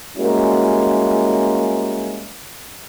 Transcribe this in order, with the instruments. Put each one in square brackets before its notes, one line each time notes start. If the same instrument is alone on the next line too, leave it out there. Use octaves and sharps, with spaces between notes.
[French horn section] G3 G#3 A#3 C#4 E4 F#4